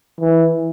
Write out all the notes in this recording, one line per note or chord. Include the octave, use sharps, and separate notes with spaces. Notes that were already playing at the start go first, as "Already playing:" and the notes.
E3